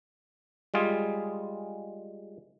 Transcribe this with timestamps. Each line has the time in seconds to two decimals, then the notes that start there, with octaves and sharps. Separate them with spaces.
0.74 G3 G#3 F4 G#4